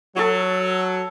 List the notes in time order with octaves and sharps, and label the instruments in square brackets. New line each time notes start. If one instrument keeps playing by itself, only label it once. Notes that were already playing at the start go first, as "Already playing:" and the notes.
[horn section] F#3 [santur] A4 C#6